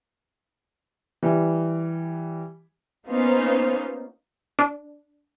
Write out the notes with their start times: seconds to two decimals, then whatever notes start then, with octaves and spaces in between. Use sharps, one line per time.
1.23 E3 G3
3.08 A#3 B3 C#4 D#4 F4 C5
4.59 D4